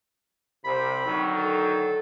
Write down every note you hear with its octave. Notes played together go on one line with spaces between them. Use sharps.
C2 C3 B5
D3 D#3 F#3
A4